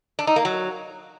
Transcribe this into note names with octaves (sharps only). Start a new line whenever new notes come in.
D4
D#4
A#3
F#3